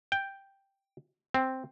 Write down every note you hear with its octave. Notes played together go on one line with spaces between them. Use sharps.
G5
C4